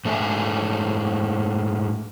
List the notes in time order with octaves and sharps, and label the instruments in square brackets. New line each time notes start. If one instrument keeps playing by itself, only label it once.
[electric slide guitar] G#2 A3 D4 G#4 E5 G#5